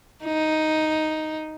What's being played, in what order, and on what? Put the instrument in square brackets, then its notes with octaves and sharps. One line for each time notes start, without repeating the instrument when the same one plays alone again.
[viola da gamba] D#4